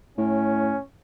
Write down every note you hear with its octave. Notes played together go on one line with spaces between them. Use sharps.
A2 C#4